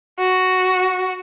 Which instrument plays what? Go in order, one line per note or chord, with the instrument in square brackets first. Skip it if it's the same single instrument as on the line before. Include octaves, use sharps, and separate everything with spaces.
[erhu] F#4